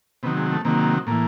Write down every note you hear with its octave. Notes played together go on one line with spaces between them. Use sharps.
C3 D#3 F#3 B3
G#3
A3
C3 D#3 F#3 A#3
A2 E3 A#3